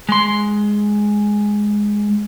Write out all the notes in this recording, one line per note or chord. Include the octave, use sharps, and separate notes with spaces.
G#3 C6